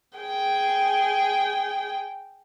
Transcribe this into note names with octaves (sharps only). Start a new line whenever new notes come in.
G#4 G5